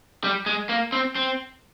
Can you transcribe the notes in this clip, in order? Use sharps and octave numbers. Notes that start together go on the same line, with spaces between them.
G3
G#3
A#3
C4
C4